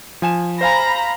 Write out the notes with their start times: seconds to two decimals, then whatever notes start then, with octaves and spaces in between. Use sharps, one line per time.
0.22 F3 G#5 E7
0.61 C5 F5 G#5 A#5 B5 A#6